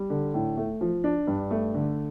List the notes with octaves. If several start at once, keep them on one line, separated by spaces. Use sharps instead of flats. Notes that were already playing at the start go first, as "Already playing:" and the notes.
Already playing: G3
D3
A2
A3
F3
D4
G2
A3
D3